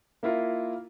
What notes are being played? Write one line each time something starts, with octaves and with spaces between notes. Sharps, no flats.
A#3 E4 F4 A#4